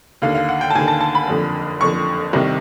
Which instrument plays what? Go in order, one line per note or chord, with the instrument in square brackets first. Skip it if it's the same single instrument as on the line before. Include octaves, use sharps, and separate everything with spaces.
[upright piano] D#2 D3 F5
F5
F#5
G5
A5
D#2 D3 G#5
A5
A5
B5
F#1 F2 D3
F#1 F2 D3 C#6
C2 C3 D#3